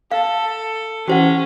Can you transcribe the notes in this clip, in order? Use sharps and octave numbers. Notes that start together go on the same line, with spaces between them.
A4 F5
E3 C#4 F#4 G4 C5 F#5